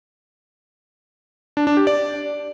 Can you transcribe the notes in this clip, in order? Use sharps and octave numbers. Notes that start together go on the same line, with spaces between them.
D4
D4
G4
D5